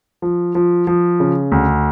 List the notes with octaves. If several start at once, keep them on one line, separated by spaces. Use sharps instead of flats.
F3
F3
F3
C#3
D2